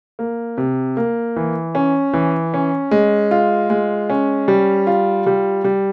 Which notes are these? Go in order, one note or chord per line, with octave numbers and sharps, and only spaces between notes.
A#3
C3
A#3
E3
C#4
E3
C#4
G#3
F4
G#3
C#4
G3
F4
G3
G3